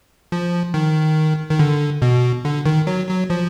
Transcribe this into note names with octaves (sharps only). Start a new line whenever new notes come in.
F3
D#3
D#3
D3
B2
D3
D#3
F#3
F#3
F3